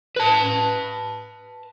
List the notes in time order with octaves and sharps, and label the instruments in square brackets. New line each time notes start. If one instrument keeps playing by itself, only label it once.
[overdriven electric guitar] B4 A5